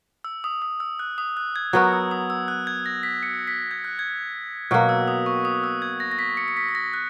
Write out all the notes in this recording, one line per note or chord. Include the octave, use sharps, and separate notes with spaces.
E6
D#6
D#6
E6
F#6
D#6
F#6
G#6
F#3 B3 F#4 A#4 F#6
E6
D#6
E6
F#6
G#6
A#6
B6
C#7
B6
G#6
F#6
G#6
B2 F#3 A#3 F#6
E6
D#6
C#6
D#6
E6
G#6
A#6
A#6
B6
C#7
C#7
B6
B6
A#6
F#6